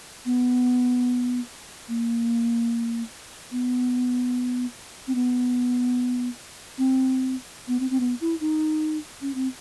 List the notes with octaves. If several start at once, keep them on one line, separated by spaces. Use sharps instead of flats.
B3
A#3
B3
C4
B3
C4
B3
C4
C4
B3
E4
D#4
C#4
C4